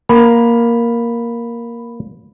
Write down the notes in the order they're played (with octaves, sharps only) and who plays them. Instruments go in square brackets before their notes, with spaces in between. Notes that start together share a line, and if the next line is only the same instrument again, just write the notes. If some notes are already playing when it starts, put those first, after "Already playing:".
[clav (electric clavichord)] A#3 [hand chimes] B5